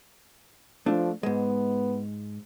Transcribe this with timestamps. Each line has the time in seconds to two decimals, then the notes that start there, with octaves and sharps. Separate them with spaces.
0.86 F3 A3 D4
1.23 G#2 G#3 B3